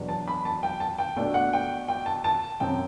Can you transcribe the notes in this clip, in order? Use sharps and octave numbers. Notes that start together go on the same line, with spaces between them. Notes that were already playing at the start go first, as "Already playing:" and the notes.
Already playing: E2 B2 F#3 B3 D4
A5
B5
A5
G5
A5
G5
B2 A3 D4 G5
F#5
G5
G5
A5
A5
F#2 F#3 C4 G5